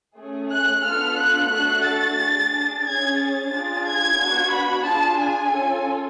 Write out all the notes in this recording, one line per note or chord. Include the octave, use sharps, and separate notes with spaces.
A3 C#4 G#4
F#6
B3 D4 F4 A4 F6
F#6
A3 D4 F#4 A4 F#6
A6
D4 G#4
C#4 G#4 G#6
A6
D4 F4 G#4
G#6
B3 D4 F#4
B5
D4 F4 G#4 A5
G#5
C#4 F4 A4